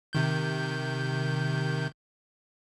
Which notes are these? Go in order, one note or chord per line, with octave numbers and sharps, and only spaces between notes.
C3 D#3 G6